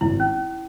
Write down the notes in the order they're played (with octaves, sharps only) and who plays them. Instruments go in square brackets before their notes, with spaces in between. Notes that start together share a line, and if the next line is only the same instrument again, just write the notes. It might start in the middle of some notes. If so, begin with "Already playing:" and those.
[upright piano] G#1 [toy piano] E4
[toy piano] C#4